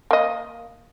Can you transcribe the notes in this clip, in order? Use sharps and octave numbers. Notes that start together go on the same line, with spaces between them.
A#3 D#5